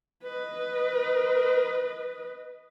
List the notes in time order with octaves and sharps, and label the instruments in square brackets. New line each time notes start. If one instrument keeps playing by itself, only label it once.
[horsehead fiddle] B4 D#5